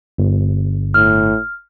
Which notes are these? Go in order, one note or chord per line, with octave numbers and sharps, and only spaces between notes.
G1
A2 F6